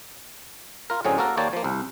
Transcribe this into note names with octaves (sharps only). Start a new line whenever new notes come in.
F4 A#4
A2 D3 F#3 C4 C#4 G#4
A#3 F#4 A4 A#4
D#2 A#3 C#5 D5 G5 A5
F3 A#3
C2